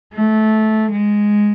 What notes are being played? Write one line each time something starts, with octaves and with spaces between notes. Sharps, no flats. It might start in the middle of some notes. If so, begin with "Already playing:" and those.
A3
G#3